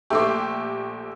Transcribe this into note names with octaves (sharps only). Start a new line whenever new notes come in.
A#1 A3 G4 C6 D6